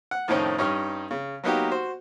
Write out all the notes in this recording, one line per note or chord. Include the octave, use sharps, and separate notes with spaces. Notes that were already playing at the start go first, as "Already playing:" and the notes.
F#5
F2 A2 D#3 C4 C#4 D#4
G2 C#4 D#4 G4 C#6 F6
C#3
F#3 A#3 B3 D#4 F#4 G4
F#4 C5